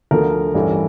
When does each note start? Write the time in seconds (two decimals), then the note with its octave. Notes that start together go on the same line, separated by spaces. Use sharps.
0.11 D2 D3 F3 A3 A#4
0.54 A1 G2 E3 A3